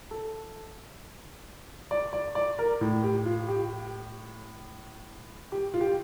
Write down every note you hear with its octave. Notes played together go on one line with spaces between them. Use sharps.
A4
D5
D5
D5
A#4
A2
G4
F4
G4
G4
F4
G4